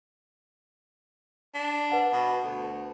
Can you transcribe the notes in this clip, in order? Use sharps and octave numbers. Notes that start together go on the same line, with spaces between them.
D4
B4 F#5 A5
B2
D2